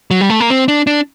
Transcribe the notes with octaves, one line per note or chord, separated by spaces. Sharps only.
F#3
G3
A3
A#3
C4
D4
D4